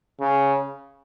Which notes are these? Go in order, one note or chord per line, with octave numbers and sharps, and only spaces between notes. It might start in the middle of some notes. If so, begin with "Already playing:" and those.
C#3